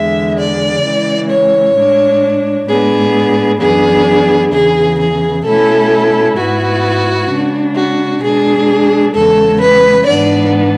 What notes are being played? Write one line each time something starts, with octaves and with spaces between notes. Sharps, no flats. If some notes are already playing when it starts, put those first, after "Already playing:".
Already playing: E2 D3 G#3 E5
D5
C#3 E3 G#3
C#5
A2 G#3 D4
A2 G#3 B3 D4 G#4
F#2 E3 B3 D4 G#4
E2 C#3 E3 G#4
G#4
B2 A3 C#4 E4 A4
G#2 G#3 B3 E4 F#4
C#3 G#3 D4
F#4
B2 G#3 D4 G#4
E2 C#3 G#3 A4
B4
G#2 E3 B3 D4 D5